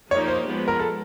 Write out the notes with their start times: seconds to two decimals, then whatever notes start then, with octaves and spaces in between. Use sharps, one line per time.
0.11 F3 A#3 D#4 G4 C#5
0.28 C5
0.45 F3 G#3 B3
0.68 A#4
0.79 A4